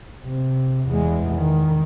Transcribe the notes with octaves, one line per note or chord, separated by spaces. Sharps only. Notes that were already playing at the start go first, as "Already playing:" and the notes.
C3
E2 G#3
D#3